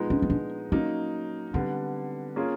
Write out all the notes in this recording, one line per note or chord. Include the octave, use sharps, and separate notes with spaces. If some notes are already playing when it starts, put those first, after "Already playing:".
Already playing: A#2 F3 G#3 B3 D#4
C#4
C#4
D4
F#3 A#3 C#4 D#4
D3 G3 B3 C4
A#3 C#4 F4 G#4 C#5